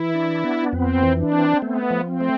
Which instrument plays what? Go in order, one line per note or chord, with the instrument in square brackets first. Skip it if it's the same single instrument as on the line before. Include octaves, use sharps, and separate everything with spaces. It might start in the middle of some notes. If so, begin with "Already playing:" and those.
Already playing: [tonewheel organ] E3 [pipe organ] E4
[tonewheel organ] D4
B3
[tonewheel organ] F2 [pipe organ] C4
[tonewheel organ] E3
[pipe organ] D4
[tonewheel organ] C4
[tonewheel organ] A3 [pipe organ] B3
[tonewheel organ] F3
[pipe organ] C4
[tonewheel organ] A3